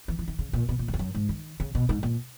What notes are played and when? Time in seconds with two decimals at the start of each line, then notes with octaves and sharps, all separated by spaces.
0.08 E3
0.19 E3
0.28 D#3
0.39 C#3
0.53 A#2
0.69 B2
0.79 A#2
0.88 F#2
0.94 E2
0.99 F#2
1.15 G#2
1.29 D#3
1.60 C#3
1.75 B2
1.89 G#2
2.03 A#2